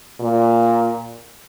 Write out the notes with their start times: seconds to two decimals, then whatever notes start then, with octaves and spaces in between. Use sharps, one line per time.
0.20 A#2